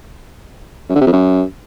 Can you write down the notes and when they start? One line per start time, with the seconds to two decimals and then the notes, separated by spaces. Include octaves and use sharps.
0.89 F#2
0.95 D3
1.01 C3
1.07 F2
1.13 F#2